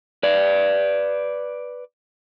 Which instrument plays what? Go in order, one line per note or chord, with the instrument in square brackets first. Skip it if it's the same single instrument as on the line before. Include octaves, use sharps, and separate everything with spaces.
[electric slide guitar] B4 D5